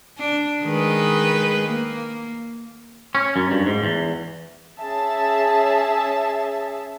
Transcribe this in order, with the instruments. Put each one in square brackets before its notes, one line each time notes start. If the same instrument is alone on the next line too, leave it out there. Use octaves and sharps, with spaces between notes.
[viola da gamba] D4
D#3 G#3 B4
A#3
[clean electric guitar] C#4
F#2
G2
G#2
E2
[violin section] C#4 G#4 E5 A5